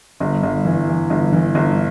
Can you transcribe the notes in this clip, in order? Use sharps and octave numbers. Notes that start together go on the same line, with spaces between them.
G1
G1
E3
E3
G1
E3
G1